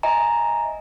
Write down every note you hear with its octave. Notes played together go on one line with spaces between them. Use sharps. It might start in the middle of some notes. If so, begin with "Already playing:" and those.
D#5 E5 G#5 A#5